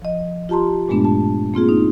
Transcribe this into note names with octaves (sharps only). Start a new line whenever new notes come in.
F3 D#5
F4 G4 A5 A#5 C6
G2 A#2 G#3 A3 B3 D4
A5
A#3 C4 F4 G#4
D#4